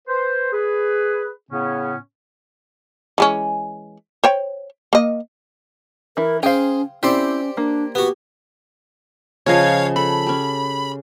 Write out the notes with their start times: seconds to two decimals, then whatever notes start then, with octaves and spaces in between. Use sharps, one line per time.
0.07 B4 C5
0.53 G#4 B4
1.50 A2 C#3 B3 C#4
3.18 E3 G#3 C#4
4.24 C5 C#5 G5
4.93 A#3 D#5
6.17 E3 E4 A#4
6.43 C#4 G#4 C5 F5 G5
7.03 C4 C#4 E4 G4 C5 D5
7.57 A#3 D4
7.95 B3 F#4 G4
9.46 C#3 F3 C#5 D#5 F5 G#6
9.96 A4 B5
10.26 C#4 G4